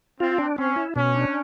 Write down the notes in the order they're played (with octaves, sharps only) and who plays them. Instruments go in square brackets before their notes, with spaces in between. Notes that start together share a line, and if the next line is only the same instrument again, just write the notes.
[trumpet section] C4 [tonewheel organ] F4
[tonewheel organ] D4
[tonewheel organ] C4 [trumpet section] C#4
[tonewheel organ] E4
[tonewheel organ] B2 [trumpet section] C#4
[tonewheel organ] D4